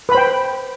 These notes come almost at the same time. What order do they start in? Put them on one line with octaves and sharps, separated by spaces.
B4 B5 C5 G5